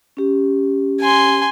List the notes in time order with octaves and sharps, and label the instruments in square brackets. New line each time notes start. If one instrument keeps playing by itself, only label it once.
[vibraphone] C#4 G4
[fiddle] G#5 C6